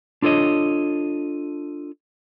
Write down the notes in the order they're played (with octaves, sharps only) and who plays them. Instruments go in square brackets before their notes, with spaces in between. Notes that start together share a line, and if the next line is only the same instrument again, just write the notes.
[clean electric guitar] D4 F4 A4 C#5 D#5